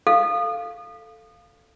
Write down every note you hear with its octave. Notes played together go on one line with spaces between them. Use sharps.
A4 F5